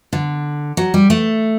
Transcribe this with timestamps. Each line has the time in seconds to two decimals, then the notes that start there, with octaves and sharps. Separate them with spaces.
0.13 D3
0.77 F#3
0.94 G3
1.10 A3